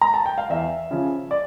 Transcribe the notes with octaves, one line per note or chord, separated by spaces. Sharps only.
A#5
A5
G5
F5
E2 E5
C#3 F3 C#4
D5